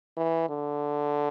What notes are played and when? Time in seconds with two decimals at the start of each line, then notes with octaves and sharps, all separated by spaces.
0.17 E3
0.49 D3